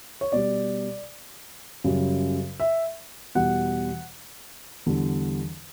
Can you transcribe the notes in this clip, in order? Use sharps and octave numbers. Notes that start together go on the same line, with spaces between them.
C#5
B2 G3 D5
F#2 C#3 G3
E5
E2 B2 G3 F#5
E2 D3 G3